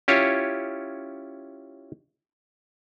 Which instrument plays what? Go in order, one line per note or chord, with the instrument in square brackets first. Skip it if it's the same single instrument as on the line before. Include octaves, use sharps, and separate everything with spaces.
[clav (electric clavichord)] C#4 E4 F4 G4 C#5